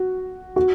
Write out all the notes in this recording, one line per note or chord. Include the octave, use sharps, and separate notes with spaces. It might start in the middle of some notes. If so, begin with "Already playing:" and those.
Already playing: F#4
F#4